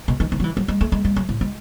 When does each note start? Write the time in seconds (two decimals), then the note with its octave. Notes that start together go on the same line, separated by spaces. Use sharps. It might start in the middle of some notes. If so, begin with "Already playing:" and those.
0.08 B2
0.20 D#3
0.32 D#3
0.40 F#3
0.44 E3
0.57 F#3
0.68 G#3
0.81 A3
0.92 G#3
1.05 G#3
1.16 F#3
1.29 A2
1.41 G#3